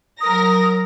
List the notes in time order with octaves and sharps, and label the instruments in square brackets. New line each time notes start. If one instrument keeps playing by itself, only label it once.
[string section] F#3 A#4 A#6 [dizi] D#6